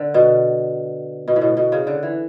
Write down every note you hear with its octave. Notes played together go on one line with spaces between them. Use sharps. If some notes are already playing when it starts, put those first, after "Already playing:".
Already playing: D3
B2
B2
A2
B2
B2
C#3
D3
E3